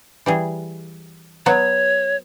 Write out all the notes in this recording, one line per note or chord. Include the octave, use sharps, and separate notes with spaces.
E3 G3 G#4
F#3 B3 F#4 C#5